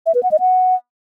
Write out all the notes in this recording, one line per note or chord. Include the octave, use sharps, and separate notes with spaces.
E5
B4
F#5
D#5
F#5